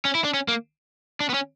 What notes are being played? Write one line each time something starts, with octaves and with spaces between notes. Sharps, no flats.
C#4
E4
D4
C#4
A#3
D4
B3
C#4